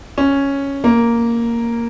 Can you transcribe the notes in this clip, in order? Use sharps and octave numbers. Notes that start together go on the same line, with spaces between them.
C#4
A#3